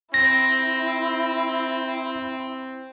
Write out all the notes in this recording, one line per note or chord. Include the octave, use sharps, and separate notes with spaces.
C4 E4 A#6